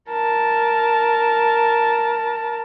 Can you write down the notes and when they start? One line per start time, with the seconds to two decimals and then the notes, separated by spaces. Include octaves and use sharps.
0.11 A#4 A5